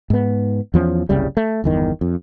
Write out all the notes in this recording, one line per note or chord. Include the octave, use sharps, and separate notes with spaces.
G#2 B3
E2 F3 B3 C#4
F#1 C2 C#3 G3
A3
G1 E2 D#3
F2